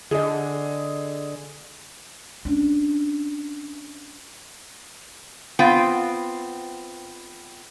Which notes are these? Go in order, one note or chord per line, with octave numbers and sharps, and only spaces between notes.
D3 G#4 D#5
C#4 D4
B3 C4 F4 G5